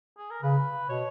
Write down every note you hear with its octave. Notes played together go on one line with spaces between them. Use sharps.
G#4
A#4
C#3 B4
B2 C#5